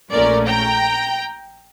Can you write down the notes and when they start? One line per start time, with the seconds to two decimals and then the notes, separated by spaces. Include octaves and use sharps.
0.11 A#1 A#2 A3 C#4 A#4 D5
0.47 G5 A#5